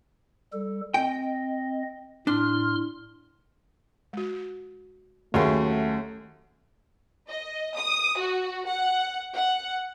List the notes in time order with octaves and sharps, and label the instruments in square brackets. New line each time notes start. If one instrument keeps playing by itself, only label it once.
[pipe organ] G3 A4
[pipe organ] C4 D#5 [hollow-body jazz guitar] G5
[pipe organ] A2 C6 F6 [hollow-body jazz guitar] D4
[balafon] G#3 F#4
[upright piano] D#2 [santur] F#3 C#4 C6 [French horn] A3 [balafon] G#4 A#4 E5
[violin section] D#5
D#6
F#4
F#5
F#5